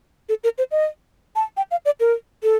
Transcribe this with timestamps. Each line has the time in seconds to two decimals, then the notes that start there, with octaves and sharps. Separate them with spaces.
0.29 A4
0.44 A#4
0.58 C5
0.71 D#5
1.36 A5
1.57 G5
1.71 F5
1.85 D5
2.00 A#4
2.43 A4